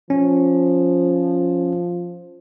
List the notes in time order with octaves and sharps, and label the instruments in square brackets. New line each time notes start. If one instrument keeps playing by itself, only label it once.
[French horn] F3 [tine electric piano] C#4